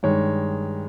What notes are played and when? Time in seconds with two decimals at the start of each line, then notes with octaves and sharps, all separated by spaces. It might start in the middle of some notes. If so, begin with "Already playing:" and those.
0.03 G2 D#3 G#3 C#5